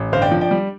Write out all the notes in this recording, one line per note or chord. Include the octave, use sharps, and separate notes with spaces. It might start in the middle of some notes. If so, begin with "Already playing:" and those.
Already playing: A1
G1 C5 F5
D5 G5
F3
D5 G5
G3